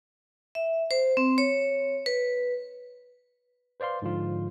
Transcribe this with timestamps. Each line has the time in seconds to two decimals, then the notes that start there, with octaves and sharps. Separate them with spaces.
0.55 E5
0.91 C5
1.17 C4
1.38 C#5
2.06 B4
3.80 B4 C5 D5 F5 C6
4.02 G#2 D3 F3 F4